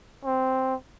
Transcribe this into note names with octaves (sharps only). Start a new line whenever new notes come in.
C4